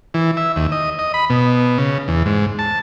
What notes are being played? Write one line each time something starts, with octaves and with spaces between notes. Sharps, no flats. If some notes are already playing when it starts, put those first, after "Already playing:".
E3
E5
D#2
D#5
D#5
B5
B2
C#3
E2
G#2
A5